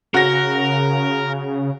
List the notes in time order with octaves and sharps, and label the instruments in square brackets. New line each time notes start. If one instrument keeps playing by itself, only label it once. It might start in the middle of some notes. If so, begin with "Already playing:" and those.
[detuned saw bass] C#3 [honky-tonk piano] F#4 A#6 [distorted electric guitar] A#4